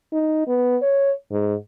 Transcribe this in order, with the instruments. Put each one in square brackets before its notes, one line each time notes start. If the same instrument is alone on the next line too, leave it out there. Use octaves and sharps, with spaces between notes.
[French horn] D#4
B3
C#5
G#2